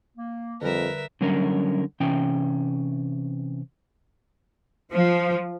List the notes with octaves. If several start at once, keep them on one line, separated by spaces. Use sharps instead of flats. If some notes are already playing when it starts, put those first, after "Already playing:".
A#3
F2 D3 G3 A#4 B4 E5 F6
D3 F#3 G3 C#4 A#4
C3 E3 C#4 G5
F3